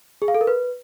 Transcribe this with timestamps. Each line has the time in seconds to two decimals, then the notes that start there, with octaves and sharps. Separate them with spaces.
0.22 G#4
0.28 F5
0.35 A4
0.41 A#4
0.47 B4